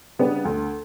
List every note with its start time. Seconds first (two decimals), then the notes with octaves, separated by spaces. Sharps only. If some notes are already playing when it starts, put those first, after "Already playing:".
0.19 C#3 G3 B3 D4
0.45 D2